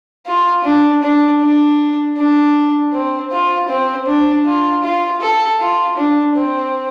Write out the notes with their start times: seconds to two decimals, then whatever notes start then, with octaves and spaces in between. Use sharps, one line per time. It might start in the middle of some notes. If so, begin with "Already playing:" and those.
0.26 F4
0.64 D4
1.02 D4
1.41 D4
2.17 D4
2.93 C4
3.31 F4
3.69 C4
4.07 D4
4.45 F4
4.83 F4
5.21 A4
5.60 F4
5.97 D4
6.35 C4